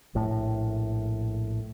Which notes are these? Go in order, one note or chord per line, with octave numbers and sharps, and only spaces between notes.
A#1 A2